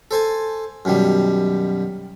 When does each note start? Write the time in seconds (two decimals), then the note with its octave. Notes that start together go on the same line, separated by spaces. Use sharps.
0.11 A4 C5 G#5 A5
0.85 F#2 B2 D#3 G3